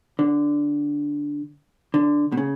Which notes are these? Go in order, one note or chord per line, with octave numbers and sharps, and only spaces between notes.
D3
D3
B2
C#3